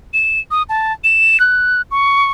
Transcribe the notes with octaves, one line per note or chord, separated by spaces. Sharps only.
E7
D#6
A5
E7
F#6
C#6